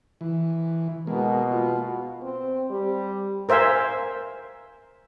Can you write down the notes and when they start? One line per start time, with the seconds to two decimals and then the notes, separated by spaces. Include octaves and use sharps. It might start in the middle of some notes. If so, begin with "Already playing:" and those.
0.21 E3
1.07 B2 G#3 A#3
1.51 F4
2.22 C4
2.70 G3
3.49 A#4 C5 E5 F5 G#5